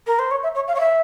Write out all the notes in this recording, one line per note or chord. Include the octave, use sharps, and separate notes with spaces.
A#4
C5
C#5
E5
C#5
F5
C#5
E5